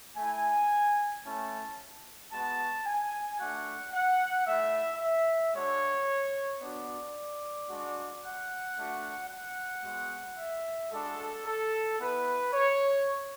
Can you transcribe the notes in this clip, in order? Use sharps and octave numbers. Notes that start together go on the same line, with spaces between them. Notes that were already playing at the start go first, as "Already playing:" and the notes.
A3 E4 G#5
A3 C#4 E4 A5
G#3 B3 F#4 A5
G#5
A3 D4 F#4 F#5
F#5
A3 E4 E5
E5
G#3 D4 F#4 C#5
B3 D4 F#4 D5
G#3 D4 F#4
F#5
A3 D4 F#4
F#5
G#3 B3 F#4
E5
G#3 D4 F#4 A4
A4
B3 E4 B4
C#5